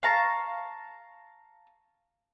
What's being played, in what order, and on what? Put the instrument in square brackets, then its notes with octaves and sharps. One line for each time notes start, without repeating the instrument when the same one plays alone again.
[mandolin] F5 A5 A#5 C#6